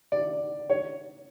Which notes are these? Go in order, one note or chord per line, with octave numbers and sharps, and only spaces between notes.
D5
C#5